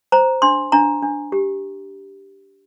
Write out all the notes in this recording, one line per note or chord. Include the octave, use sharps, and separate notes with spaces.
C5 A#5
D4 C6
D4 A#5
D4
G4